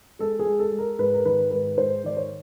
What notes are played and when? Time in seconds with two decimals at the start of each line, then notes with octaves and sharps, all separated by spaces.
0.19 G#3 A4
0.39 G#4
0.47 G#3
0.59 A4
0.72 G#3
0.78 A#4
0.99 G#2 B4
1.14 A#4
1.25 D#3 B4
1.51 G#2 B4
1.77 G#2 C5
2.04 D#3 D5
2.17 C#5